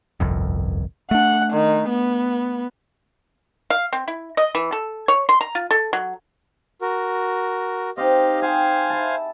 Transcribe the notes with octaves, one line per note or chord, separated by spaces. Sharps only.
G1 C2 F2
A3 D4 F#5
D#3
B3
F5
C4
E4
D#5
E3
A4
C#5
C6
A#5
F4
A4
F#3
F#4 A#4
C4 D#4 G4 D#5 F5
G4 G#4 C5 F5 G#5
E4 A5